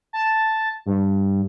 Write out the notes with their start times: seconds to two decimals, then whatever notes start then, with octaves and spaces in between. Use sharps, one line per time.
0.13 A5
0.86 G2